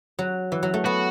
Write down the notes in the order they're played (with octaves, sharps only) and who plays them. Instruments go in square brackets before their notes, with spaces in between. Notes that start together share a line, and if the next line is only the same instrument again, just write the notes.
[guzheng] F#3
E3
F#3
A3
[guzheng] B3 [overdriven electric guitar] F#4